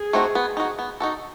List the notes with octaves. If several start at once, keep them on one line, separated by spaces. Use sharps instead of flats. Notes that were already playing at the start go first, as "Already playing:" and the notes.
Already playing: G#4
A3 C4 D#4 F#4
B3
D#4 F#4
B3
D#4 F#4 A4